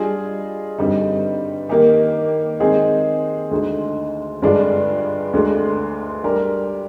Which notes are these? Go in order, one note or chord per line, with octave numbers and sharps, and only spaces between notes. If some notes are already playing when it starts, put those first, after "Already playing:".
Already playing: G3 D4 F4 G#4 D#5
G2 D3 G3 C4 D#4
D#3 A#3 D#4 G4
D#3 G#3 C4 D#4 G#4
D2 D3 G#3 D#4
G2 D3 G#3 D4 F4
D2 D3 G#3
G3 D4 G4 A#4